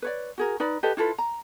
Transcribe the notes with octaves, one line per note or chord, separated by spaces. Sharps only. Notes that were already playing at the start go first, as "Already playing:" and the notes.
B4 C#5 D5
F#4 G#4 A#4
D#4 B4 D5 B5
G4 A4 B4 D#5
E4 F4 A4 B4
A#5